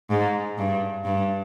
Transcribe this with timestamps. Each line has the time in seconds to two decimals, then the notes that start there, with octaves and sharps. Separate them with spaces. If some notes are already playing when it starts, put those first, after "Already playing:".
0.10 G#2
0.58 G2
1.05 G2